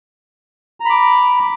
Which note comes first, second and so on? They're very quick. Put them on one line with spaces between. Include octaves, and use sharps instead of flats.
A#5 B5 D6